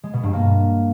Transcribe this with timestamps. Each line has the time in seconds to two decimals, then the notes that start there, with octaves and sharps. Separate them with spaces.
0.03 G#3
0.13 B2
0.23 G2
0.33 A#3